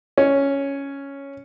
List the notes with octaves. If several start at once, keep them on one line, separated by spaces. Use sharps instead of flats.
C#4